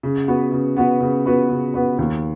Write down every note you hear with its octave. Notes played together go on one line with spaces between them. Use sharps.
C#3
B3 F#4 B4
C#3
B3 F#4 B4
C#3
B3 F#4 B4
C#3
B3 F#4 B4
D#2